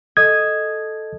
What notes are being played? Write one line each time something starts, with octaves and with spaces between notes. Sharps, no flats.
A4 D#5 D#6 G#6